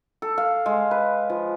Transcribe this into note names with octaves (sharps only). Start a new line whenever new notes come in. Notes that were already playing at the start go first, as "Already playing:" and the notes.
A4
F5
G#3
B4
F3